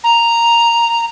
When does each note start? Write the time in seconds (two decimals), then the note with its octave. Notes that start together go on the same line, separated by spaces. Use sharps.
0.04 A#5